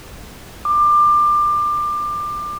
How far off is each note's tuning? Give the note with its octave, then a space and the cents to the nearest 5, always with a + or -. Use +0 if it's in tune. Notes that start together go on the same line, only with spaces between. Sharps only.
D6 +25